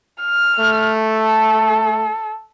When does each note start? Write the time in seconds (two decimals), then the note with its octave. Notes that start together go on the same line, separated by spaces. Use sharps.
0.22 F6
0.59 A3
1.00 A4